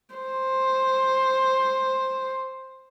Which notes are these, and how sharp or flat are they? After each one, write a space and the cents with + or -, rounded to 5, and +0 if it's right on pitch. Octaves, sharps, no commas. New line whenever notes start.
C5 +10